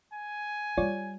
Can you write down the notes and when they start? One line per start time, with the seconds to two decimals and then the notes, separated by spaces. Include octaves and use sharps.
0.13 G#5
0.77 G3 F4 C#5 D5